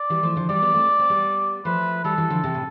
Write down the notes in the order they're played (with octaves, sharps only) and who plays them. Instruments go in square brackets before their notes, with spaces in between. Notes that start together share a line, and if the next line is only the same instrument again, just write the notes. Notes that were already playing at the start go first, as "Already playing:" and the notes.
Already playing: [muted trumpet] D5
[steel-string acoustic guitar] E3 G3
F3 A3
D3 F3
[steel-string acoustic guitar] E3 G3 [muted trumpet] D5
[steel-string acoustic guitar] G3 B3
A3 C4
B3
C4
G3 B3
[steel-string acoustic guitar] F3 A3 [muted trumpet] B4
[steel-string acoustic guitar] E3 G3 [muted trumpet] A4
[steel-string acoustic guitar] E3 G3
D3 F3
C3 E3
A2